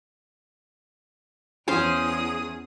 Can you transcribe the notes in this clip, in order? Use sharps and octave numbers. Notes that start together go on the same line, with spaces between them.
E2 C#4 G#4 C5 F5 D#6